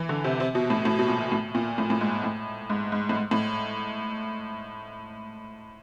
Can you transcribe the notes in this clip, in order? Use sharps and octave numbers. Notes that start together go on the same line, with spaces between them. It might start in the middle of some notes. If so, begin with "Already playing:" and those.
Already playing: E3
D3
C3
C3
B2
A2
A2
B2
A#2
A2
A#2
A2
A2
G#2
A2
G#2
G#2
A2
G#2
A2